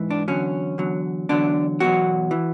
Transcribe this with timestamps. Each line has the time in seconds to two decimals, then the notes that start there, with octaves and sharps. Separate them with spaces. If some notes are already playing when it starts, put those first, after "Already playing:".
Already playing: G#2 E3
0.11 D4
0.28 E2 D3 F#3 C#4
0.78 E2 D3 F#3
1.29 E2 D3 F#3 D4
1.80 E2 B2 F#3 F#4
2.31 E3